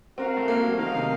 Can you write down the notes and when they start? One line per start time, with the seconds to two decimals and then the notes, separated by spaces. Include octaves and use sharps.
0.17 C4 F#4 A#4 F5
0.37 A3
0.48 A#3
0.64 F#3
0.79 D#3 D#4 A#4 F5
0.95 C3